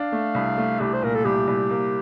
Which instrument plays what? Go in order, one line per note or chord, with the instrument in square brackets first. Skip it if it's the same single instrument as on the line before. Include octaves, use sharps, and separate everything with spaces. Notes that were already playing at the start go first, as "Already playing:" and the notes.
Already playing: [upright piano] D4 [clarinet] F5
[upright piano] A3
C2
A3
[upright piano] C2 [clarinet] G4
[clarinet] C5
[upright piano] A#2 [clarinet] A#4
[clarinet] A4
[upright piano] C2 [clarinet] G4
[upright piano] C2
A#3